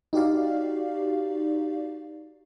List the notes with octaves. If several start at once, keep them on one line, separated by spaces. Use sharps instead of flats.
D#4 F#4 G4 D5 F5